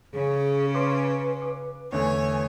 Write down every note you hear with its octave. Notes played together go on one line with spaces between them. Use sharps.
C#3 C#4 G#4
B4 C6 D6
D6
E2 D3 A3 C#5 G#5